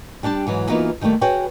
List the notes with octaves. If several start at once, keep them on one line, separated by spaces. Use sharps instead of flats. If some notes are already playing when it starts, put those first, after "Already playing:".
G3 D4 G4 A5
G#2 E3 F#3
E3 A#3 B3 D#4 F4 F#4
D#3 F3 G3 A3 A#3
F#4 G#4 B4 C#5 G5